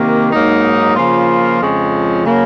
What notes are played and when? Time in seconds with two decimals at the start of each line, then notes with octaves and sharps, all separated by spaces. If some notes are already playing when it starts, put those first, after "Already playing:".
Already playing: C3 D#3 A#3
0.32 G#2 F#3 A#3 D#4
0.97 C#3 F3 A#3 F4
1.61 F2 C#3 F3 G#3 C#4
2.26 C#3 F#3 A#3